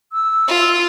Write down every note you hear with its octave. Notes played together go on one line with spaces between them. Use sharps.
E6
F4